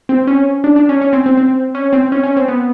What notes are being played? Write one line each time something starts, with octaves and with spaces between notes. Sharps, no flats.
C4
C#4
D4
D4
C#4
C#4
C4
C4
C4
C#4
C4
C#4
C#4
C4
B3